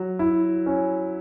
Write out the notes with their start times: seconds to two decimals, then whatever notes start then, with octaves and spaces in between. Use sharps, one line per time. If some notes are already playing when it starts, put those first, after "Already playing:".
Already playing: F#3
0.19 E4
0.66 C#4